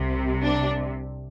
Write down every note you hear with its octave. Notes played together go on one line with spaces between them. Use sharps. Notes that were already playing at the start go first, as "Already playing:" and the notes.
Already playing: C2 C3
D4